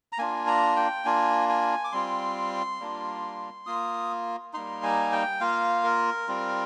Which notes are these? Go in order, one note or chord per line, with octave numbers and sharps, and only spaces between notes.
A#5
A#3 D4 F4 G#5
A#5
G5
A#3 D4 F4 G#5
G#5
D6
G3 C4 F4 C6
G3 A#3 D4 F4
A#3 F4 D#6
G3 A#3 D#4 C6
G#5
G5
A#3 F4 F5
A#4
G3 C4 F4